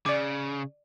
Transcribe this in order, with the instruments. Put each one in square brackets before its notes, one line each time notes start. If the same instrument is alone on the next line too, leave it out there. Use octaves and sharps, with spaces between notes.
[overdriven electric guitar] C#3 [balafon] D5 D6